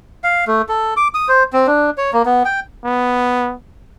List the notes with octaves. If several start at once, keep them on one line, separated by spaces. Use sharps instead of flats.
F5
A3
A4
D6
D#6
C5
C4
D4
C#5
A#3
B3
G5
B3